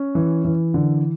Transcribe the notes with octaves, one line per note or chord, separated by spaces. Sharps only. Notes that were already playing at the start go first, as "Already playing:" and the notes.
Already playing: C#4
E3
E3
D3